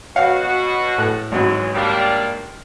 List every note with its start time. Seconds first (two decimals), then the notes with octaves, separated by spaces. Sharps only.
0.16 B2 F#4 C#5 F5 F#5
0.98 A2 A4 F#6
1.32 G#1 E3 F#3 G#3 C#4 F#4
1.75 G3 A#3 D4